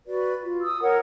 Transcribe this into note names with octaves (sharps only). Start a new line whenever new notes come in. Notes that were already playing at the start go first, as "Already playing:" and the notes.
F#4 B4 D5
F4
D#6 E6
A#4 C#5 F#5